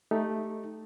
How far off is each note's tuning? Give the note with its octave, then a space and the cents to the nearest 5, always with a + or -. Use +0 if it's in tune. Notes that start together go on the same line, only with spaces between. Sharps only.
A3 +0 D#4 +0 G4 +0